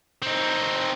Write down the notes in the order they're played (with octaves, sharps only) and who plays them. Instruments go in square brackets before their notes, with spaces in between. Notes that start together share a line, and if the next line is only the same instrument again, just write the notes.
[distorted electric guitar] C4 D#4